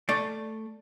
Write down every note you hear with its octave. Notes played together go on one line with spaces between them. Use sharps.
A3 D5